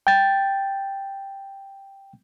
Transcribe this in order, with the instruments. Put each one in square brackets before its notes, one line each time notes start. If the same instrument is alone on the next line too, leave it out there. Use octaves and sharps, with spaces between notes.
[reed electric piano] G5 A6